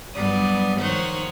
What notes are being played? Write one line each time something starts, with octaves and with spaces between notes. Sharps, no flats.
G2 F#3 G3 B3 D5 D#6
D#3 F3 C5 C#5 F#5 G6